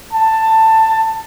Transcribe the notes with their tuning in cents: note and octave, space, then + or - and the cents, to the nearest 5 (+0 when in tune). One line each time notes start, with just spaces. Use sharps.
A5 +15